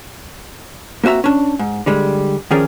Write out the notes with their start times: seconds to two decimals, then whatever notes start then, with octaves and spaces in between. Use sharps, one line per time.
1.04 A#3 C4 F#4 E5 A#5
1.24 C#4 D4
1.59 G#2
1.86 D3 G3 G#3
2.51 D#3 F3 C#4 G#4 A#4 D5